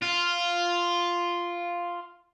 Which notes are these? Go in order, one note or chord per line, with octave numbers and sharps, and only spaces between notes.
F4